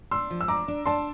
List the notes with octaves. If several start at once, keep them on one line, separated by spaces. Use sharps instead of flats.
D4 C6 E6
F3
E6
D4 A#5 D6
D4
D4 A5 C6